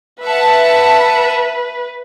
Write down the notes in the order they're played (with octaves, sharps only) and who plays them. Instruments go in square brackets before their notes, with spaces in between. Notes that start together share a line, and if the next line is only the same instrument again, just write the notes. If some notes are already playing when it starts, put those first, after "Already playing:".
[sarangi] B4 [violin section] E5 F#5 A5